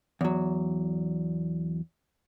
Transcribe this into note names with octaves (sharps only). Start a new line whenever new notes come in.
E2 F#3